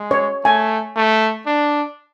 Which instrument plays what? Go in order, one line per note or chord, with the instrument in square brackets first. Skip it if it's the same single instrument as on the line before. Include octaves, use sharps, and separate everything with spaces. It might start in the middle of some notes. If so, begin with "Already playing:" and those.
Already playing: [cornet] G#3
[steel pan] C#5
[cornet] A3 [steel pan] G#5
[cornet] A3
D4